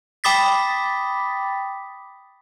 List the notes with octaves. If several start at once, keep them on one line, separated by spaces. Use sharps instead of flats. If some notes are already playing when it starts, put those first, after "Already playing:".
G5 B5 D6 D#6 A6 B6